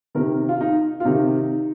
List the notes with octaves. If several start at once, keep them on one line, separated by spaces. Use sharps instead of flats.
C3 D#3 A#4
F4
D#4
F4
C3 D#3 D#4